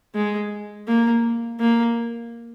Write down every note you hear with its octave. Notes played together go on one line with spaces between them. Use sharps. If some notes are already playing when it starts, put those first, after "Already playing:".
G#3
A#3
A#3